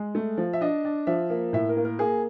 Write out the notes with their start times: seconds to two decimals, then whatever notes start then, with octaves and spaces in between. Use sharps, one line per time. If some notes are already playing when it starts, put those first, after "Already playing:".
Already playing: G#3
0.15 A3
0.37 F3
0.53 E5
0.61 D4 D#5
0.85 D4
1.07 F3 E5
1.30 A#3
1.53 A2 E5
1.69 A#4
1.77 A#3
1.85 A#4
1.99 A#3 G#4